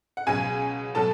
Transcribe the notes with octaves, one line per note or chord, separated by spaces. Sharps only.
F#5
C#2 B2 F#3 G#4 G#5
B2 F#3 A4 A5